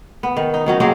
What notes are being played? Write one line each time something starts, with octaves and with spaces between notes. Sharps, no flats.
B3
D#3
D#4
D#3 F#3 C#4
F#3 A#3 C4 G#4